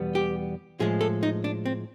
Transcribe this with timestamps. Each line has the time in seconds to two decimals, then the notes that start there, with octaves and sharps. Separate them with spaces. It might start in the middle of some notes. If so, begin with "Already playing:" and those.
Already playing: E2 B2 G3 B3
0.15 G4
0.80 A2 F3 G#3 G#4
1.01 A4
1.23 D#4
1.44 D4
1.66 C4